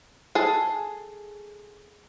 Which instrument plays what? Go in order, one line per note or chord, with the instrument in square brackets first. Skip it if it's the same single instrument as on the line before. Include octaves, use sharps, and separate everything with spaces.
[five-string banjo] G#4 A4 A5